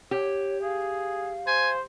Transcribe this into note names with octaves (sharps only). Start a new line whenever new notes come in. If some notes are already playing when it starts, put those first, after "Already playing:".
G4 C#5
G#4 F5
C5 G#5